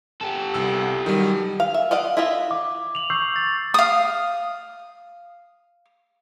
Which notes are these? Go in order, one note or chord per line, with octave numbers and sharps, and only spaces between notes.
G4 A4
C2 E6
D#3 F#3 G3
F5
E5
D5 D#5 F5 F#5
E4 F4 D#5 E5
D6
F7 F#7
C#6 E6 G6 C7
A6
F5 D#6